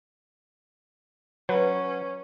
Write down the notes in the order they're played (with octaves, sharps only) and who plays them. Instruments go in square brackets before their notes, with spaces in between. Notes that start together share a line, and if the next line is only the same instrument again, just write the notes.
[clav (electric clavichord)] F#3 [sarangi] C#4 [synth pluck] B4